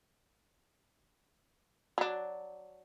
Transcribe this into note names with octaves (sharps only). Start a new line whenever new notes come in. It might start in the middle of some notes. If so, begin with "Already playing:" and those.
F#3 D4